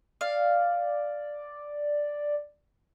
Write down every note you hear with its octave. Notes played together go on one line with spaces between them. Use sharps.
D5 F5